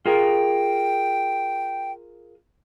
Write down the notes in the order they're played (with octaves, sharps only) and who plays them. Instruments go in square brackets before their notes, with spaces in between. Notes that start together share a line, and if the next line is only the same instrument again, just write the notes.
[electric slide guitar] F4 G#4 A#4 [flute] G5